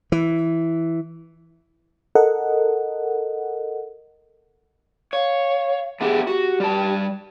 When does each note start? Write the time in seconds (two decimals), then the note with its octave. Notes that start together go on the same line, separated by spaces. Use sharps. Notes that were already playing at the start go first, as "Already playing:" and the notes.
0.12 E3
2.15 A4 A#4 D#5 F#5
5.13 C#5 F5
6.01 A3 B3 G4 G#4
6.27 F#4 G4
6.60 G3 A5